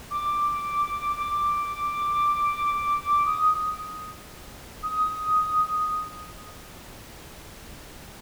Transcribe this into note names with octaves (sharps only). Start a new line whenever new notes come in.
D6
D6
D#6
D#6